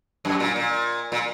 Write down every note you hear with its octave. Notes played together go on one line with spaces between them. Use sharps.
F#2
A#2
A#2
A#2